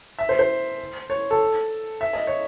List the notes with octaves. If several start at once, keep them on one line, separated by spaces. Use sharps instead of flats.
E5
C5
C5
C#5
A4
E5
D#5
C#5